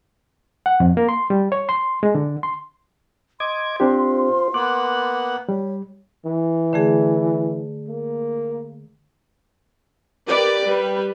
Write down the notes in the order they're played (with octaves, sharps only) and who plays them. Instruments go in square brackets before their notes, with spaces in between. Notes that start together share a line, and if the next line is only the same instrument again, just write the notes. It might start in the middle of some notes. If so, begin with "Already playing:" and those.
[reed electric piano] F#5
F2
A#3
C6
G3
C#5
C6
G#3
D3
C6
[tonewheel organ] D#5 D6 G#6 [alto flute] C6
[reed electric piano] C4 D4 G4 [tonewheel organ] F4 C5
[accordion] A#3 B3 [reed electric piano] D6 [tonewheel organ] F#6
[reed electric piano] G3 [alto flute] C#5
[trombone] E3
[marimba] D3 A3 G#4
[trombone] A#3
[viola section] G4 A#4 B4 D5
G3 B4